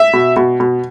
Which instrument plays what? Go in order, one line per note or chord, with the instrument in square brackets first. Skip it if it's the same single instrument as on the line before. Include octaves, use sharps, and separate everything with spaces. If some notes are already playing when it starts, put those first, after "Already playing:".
Already playing: [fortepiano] E5
B2
B2
B2